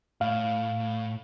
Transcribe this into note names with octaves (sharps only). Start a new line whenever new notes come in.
A2 F5